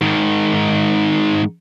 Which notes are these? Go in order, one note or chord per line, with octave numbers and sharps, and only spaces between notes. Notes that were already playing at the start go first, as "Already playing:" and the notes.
G#2 D#3